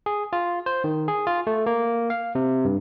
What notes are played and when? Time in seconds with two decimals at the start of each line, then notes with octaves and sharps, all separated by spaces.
0.06 G#4
0.33 F4
0.66 C5
0.84 D#3
1.08 G#4
1.27 F4
1.47 A3
1.66 A#3
2.10 F5
2.35 C3
2.65 G2